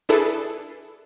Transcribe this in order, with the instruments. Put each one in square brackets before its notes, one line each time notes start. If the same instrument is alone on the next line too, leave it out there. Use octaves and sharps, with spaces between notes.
[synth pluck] D4 E4 G#4 A4 B4